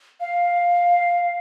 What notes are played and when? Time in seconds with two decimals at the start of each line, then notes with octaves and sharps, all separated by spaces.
0.20 F5